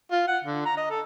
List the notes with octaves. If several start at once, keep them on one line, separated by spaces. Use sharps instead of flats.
F4
F#5
D3
A#5
D#5
A4